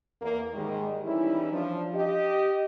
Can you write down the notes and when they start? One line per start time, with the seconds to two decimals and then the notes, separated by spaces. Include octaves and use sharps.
0.21 E2 A#3
0.53 G#2 D#3 G3 G#3
1.05 E3 G3 C#4 D#4 E4
1.52 F3 D4
1.95 G4 D#5